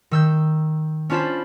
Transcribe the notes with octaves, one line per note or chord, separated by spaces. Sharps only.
D#3 E6 G6
C#4 D4 F4 C5 A5 B5